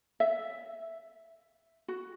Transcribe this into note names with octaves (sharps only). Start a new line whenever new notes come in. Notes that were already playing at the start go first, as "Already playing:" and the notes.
E5
F#4